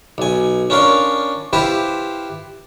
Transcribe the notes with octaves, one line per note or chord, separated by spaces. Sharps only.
B1 G#5
C#4 D4 F4 A#4 F5
E4 F4 G4 B4 C5